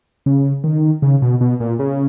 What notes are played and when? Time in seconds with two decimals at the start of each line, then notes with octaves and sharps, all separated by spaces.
0.26 C#3
0.64 D#3
1.02 C#3
1.22 B2
1.41 B2
1.60 A#2
1.79 C#3